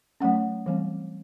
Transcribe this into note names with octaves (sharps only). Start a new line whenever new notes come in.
F#3 A3 C#4 F#5
E3 G3 C4